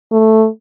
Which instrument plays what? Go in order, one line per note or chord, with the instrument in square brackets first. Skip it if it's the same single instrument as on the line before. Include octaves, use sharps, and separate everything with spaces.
[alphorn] A3